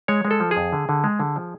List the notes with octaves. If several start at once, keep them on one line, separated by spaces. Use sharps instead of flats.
G#3 C#5
G#3
A4
F3
G#4
F2
D3
D3
G#3
D3
F3